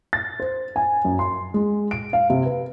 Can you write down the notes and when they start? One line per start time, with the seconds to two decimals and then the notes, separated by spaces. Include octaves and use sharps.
0.13 A6
0.40 C5
0.76 G#5
1.05 F#2
1.19 C6
1.54 G#3
1.91 D7
2.13 F5
2.30 C3
2.45 B4